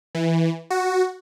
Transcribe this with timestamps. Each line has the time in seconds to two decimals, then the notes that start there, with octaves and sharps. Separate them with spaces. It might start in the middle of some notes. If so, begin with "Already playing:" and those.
0.15 E3
0.70 F#4